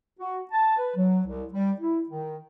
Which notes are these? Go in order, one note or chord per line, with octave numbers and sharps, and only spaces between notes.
F#4
A5
B4
F#3
C2
G3
E4
D#3